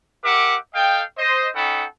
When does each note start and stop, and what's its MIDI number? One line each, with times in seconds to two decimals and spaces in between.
0.24 0.57 67
0.24 0.57 70
0.24 0.57 76
0.24 0.57 78
0.24 0.57 86
0.74 1.03 69
0.74 1.03 75
0.74 1.03 77
0.74 1.03 79
1.17 1.48 72
1.17 1.48 75
1.55 1.85 61
1.55 1.85 63
1.55 1.85 69
1.55 1.85 78
1.55 1.85 79
1.55 1.85 83